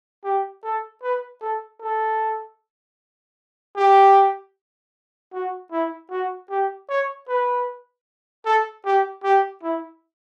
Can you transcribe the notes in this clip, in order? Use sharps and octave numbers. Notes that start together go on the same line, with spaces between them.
G4
A4
B4
A4
A4
G4
F#4
E4
F#4
G4
C#5
B4
A4
G4
G4
E4